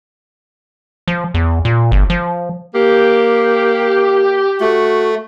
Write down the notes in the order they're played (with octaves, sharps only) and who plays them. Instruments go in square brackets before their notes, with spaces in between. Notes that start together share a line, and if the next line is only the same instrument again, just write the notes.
[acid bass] F3
E2
A#2
G1
F3
[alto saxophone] A#3 [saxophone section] G4
[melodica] A3 [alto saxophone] F#4